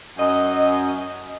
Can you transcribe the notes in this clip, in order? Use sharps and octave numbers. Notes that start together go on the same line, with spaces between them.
F#2 D#5